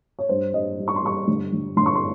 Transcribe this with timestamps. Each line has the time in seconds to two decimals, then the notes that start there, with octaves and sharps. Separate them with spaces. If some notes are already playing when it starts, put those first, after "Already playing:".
0.19 C#5
0.29 G2 C5
0.54 G2 D#5
0.78 G3
0.88 C#6
0.96 C6
1.02 G3 C#6
1.28 G1
1.53 G1
1.77 G1 C6
1.86 C#6
1.95 C6